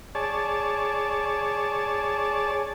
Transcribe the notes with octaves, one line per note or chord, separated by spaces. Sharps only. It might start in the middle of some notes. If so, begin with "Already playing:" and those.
G#4 C#5 D5 A5